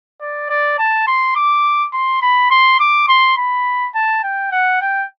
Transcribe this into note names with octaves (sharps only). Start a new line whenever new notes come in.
D5
D5
A5
C6
D6
C6
B5
C6
D6
C6
B5
A5
G5
F#5
G5